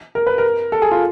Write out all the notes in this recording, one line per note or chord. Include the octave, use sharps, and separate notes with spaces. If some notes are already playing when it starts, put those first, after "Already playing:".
A#4
B4
A#4
A4
G#4
F4